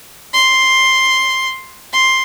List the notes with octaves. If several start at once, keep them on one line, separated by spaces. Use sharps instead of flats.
C6
C6